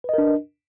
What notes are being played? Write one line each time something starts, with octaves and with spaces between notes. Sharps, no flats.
D4 A#4 B4 D#5